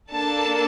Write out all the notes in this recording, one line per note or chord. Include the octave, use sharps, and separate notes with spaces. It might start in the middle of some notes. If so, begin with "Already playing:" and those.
A#3 D4 A4 A5